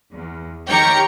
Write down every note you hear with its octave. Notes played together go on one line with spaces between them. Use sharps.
E2
D#3 G4 C#5 G5 A#5 C#7